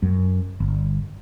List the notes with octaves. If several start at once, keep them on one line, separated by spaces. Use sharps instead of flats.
F#2
G1